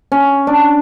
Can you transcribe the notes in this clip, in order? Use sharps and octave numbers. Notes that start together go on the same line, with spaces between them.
C#4
D4